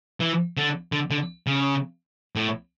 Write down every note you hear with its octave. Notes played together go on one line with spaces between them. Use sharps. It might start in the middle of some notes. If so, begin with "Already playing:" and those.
E3
D3
D3
D3
C#3
A2